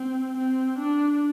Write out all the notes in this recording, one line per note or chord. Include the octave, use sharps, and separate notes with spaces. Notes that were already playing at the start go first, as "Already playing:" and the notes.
Already playing: C4
C4
D4